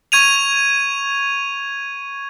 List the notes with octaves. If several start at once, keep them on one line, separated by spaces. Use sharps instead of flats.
C#6 G#6 D#7 F7